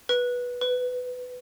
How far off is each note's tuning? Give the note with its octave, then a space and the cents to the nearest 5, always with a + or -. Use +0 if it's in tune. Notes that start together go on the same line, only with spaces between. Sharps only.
B4 -15
B4 +15